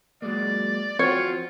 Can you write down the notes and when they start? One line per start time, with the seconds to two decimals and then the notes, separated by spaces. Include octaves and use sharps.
0.22 F#3 G#3 A#3 D5
0.99 F3 C4 F4 F#4 C#5